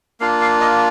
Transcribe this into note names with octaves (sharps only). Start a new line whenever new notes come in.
A#3 D4 F4 F5
F5
D#5